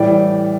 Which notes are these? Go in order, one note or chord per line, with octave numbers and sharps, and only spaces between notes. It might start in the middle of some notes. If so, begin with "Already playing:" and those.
Already playing: A2 E3 G3 D5